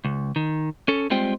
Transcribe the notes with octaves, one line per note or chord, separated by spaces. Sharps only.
C#2
D#3
C#4 A4
G3 G#3 C4 F4 C5 G5